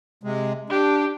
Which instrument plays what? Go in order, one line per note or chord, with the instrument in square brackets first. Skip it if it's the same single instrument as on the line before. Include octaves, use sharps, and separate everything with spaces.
[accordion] C3 G#3
[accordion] D4 [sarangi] G4